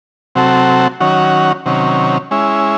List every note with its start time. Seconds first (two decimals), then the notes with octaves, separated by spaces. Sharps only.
0.35 C3 F#3 C4 F#4 A4
1.00 D#3 F#3 C#4 F#4
1.66 C3 D#3 F#3 C#4
2.31 G#3 C#4 E4